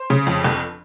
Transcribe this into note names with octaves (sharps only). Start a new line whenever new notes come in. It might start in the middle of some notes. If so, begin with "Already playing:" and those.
Already playing: C5
C#3
F2
G1